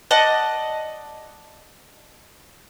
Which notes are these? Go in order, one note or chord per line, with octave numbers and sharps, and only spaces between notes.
D5 D#5 F#5 A5